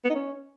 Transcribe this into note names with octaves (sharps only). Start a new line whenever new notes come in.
B3
D#4
C#4